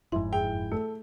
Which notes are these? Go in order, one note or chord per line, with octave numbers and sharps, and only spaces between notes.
F#1 F2 G#2 E4 C6
G#4 G5
A3 A4